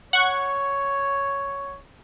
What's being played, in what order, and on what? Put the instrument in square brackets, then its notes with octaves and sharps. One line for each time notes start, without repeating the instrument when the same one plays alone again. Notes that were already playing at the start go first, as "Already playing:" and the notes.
[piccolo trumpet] C#5 [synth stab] F#5 C#6